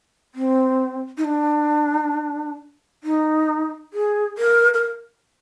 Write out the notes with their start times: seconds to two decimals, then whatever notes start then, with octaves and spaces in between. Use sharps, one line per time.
0.35 C4
1.18 D#4
1.24 D4
3.04 D#4
3.93 G#4
4.38 A#4
4.74 A#4